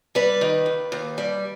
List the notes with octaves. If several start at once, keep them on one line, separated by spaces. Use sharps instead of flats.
G3 B4
D#3
D#2
D#2
G3